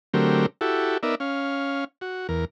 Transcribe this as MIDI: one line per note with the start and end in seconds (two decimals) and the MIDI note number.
0.14 0.46 50
0.14 0.46 54
0.14 0.46 57
0.14 0.46 60
0.14 0.46 67
0.14 0.46 70
0.61 0.98 64
0.61 0.98 66
0.61 0.98 67
0.61 0.98 69
1.03 1.15 59
1.03 1.15 63
1.03 1.15 70
1.03 1.15 74
1.03 1.15 76
1.20 1.84 61
1.20 1.84 77
2.01 2.27 66
2.29 2.45 40
2.29 2.45 70